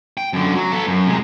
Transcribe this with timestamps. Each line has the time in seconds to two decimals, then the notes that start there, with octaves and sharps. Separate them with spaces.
0.17 G5
0.33 F#2 D3
0.55 F#3
0.72 B3 A4
0.87 F#2
1.07 C3 G#3